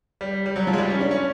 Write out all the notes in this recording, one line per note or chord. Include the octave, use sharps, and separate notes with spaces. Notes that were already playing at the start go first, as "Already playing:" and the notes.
G3
G3
F#3
F3
G#3
G3
C#4
D4
C#4